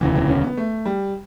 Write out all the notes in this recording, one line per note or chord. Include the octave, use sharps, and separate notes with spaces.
E1 D2 C#3 E3
E3
C#4
B3
A3
G3